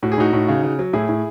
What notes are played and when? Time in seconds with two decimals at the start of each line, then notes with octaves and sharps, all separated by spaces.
0.03 A2 F#4
0.12 G#4
0.18 A2 D#4 F#4
0.33 A2
0.48 C#3
0.63 C#3
0.79 F#3
0.93 A2 E4 G#4
1.09 A2